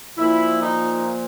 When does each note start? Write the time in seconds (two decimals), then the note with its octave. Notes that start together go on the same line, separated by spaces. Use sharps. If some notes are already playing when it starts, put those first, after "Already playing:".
0.18 A#2 F3 E4
0.61 D#4